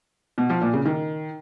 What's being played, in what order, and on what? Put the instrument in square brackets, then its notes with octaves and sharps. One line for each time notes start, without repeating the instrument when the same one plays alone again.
[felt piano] B2
F3
A#2
C#3
D#3